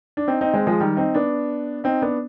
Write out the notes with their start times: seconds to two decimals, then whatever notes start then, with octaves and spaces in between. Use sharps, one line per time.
0.17 D4
0.28 C4 D#4
0.41 C4 D#4
0.54 G#3 C4
0.67 F3 G#3
0.80 D#3 G3
0.97 C4 D#4
1.14 B3 D4
1.84 C4 D#4
2.02 B3 D4